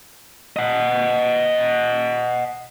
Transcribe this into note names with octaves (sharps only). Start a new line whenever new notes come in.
D#5 F#5